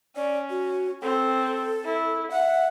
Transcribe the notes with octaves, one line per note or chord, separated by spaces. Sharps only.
C#4 D5
F#4
C4 A4
E4
E5 F#5